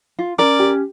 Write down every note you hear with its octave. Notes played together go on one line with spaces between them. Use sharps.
F4
C#4 A#4 D5
G4